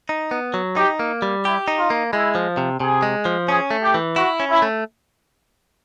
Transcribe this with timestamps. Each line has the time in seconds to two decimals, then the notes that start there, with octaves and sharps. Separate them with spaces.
0.09 D#4
0.31 B3
0.54 F#3
0.76 D#4 G4
0.99 A#3
1.22 G3
1.44 E4 G4
1.68 D#4
1.78 F4
1.90 A#3
2.12 G#3 E4
2.35 F3
2.57 C3
2.80 C3 G#4
3.03 G#3
3.25 F3
3.48 C#4 G#4
3.71 A3
3.82 G4
3.94 E3
4.16 E4 F#4
4.40 C#4
4.50 E4
4.62 A3